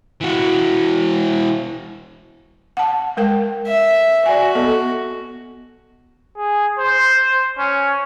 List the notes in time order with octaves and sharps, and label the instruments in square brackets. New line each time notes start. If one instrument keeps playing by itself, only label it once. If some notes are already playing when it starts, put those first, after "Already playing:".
[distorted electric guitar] E3 F#4
[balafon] F#5 A5
G#3 A#4 G5
[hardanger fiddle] E5
[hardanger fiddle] F#4 [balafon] D5 G#5
[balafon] B3 A4 D#5
[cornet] G#4
C5
C#4